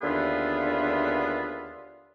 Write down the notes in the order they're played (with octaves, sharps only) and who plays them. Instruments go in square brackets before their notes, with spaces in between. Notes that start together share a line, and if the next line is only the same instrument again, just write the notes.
[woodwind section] D#2 D3 B3 F4 G#4 E5